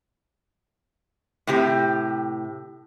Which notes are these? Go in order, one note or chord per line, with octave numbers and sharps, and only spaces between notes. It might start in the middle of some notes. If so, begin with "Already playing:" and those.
A2 C3 G4